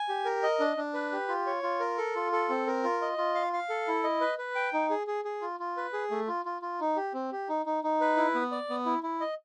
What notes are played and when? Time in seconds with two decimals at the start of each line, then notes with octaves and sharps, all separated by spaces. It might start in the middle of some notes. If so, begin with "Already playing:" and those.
Already playing: G#5
0.09 G4
0.25 A#4
0.43 D#5
0.60 D4
0.77 D4
0.94 B4
1.12 G4
1.28 F4
1.47 C#5
1.63 F4
1.80 A#4
1.98 A4
2.15 F4
2.32 A4
2.49 C4
2.67 A#4
2.83 F4
3.01 D#5
3.18 F4
3.35 F5
3.53 F5
3.69 A4
3.88 E4
4.04 D#5
4.21 B4
4.38 B4
4.55 G5
4.73 D#4
4.90 G#4
5.07 G#4
5.25 G#4
5.41 F4
5.60 F4
5.77 B4
5.93 G#4
6.11 A3
6.28 F4
6.45 F4
6.62 F4
6.80 D#4
6.96 G4
7.14 C4
7.32 G4
7.49 D#4
7.66 D#4
7.84 D#4
8.01 B4
8.17 E4
8.34 B3
8.52 D5
8.70 B3
8.86 E4
9.03 E4
9.20 D#5